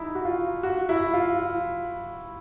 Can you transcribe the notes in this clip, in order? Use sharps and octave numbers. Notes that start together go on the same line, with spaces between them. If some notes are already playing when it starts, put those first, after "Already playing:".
Already playing: D#4 E4
F#4
F4
F#4
E4
F4
F4